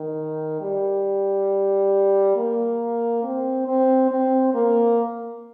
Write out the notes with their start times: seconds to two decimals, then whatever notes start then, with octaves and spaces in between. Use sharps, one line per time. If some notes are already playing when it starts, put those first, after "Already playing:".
Already playing: D#3
0.61 G3
2.36 A#3
3.23 C4
3.67 C4
4.11 C4
4.54 A#3